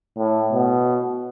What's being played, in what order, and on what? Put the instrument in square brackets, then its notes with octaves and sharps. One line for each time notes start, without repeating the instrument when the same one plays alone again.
[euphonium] A2
B2